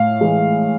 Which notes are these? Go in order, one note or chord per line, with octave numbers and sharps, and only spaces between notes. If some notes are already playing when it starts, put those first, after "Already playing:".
Already playing: A2 F5
E3 G#3